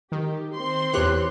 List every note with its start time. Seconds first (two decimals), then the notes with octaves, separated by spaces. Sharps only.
0.12 D#3 G4
0.54 C4 C6
0.93 E2 G4 B4 C#5 F#6